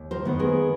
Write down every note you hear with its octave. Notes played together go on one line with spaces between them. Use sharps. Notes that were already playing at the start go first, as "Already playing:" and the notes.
Already playing: D#2
A#4 C5
D#3 G#3 B3
G#4 A#4